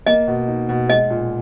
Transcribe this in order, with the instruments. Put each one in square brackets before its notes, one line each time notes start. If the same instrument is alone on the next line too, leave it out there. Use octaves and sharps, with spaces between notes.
[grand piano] A#3 [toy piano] D#5
[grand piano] B2
D#4
B2
[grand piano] G#3 [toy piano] D#5
[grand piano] A#2